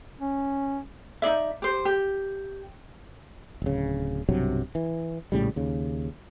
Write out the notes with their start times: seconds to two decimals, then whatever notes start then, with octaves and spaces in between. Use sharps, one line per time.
0.21 C#4
1.22 D#4 F4 D5 E5
1.62 G4 C5
1.85 G4
3.62 D1 C#3
4.29 B1 G2 C3 F#3
4.75 E3
5.32 A#1 A2 C#3 G3
5.56 D#2 C#3